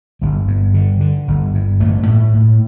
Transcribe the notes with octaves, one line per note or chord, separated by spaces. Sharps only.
G1 G3
G2
D3
D3
G1
G2
A1 A3
A2
A2